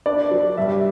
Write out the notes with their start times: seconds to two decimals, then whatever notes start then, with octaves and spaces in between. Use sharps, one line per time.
0.06 D4 D5
0.31 F#3
0.57 G2 E5